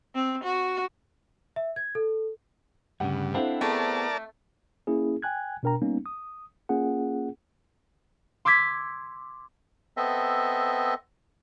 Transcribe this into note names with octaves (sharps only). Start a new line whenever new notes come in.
C4
F#4
E5
G#6
A4
D2 G2 A#2 C#3 F#5
C4 D4 E4 A4 F5 F#5
A3 B3 G#4 A#4 D5 A5
A#3 C#4 E4 G#4
G5 G#5 F#6 G#6
B2 D4 A#4 G5 A#5
G3 A#3 B3 C#4 D#4
D#6
A#3 C#4 F4 G#4 F#5
C6 D6 E6 G#6 B6
B3 C4 A4 D#5 E5